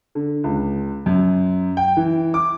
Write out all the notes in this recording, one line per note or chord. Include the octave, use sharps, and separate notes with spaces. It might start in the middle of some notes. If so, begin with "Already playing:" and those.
D3
C#2
F#2
G5
E3
D6